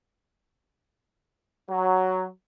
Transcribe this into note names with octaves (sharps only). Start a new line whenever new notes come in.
F#3